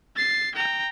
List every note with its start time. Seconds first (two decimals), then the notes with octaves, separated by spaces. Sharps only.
0.16 A6 C7
0.55 G5 A#5